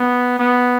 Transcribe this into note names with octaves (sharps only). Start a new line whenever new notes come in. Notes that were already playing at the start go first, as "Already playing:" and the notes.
Already playing: B3
B3